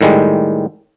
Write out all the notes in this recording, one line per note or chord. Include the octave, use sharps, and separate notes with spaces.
A2 D#3 G3 G#3